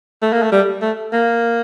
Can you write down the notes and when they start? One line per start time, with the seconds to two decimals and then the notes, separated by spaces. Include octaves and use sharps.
0.22 A3
0.33 A#3
0.43 A3
0.52 G3
0.82 A3
1.13 A#3